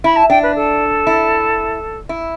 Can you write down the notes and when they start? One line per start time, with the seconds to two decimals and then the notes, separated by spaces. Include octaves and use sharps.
0.04 E4 B5
0.16 A5
0.30 D4 G5
0.43 B4
0.56 A4
1.07 E4
2.09 E4